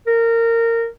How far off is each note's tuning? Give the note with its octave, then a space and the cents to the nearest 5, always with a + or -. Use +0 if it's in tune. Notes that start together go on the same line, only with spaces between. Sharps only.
A#4 -20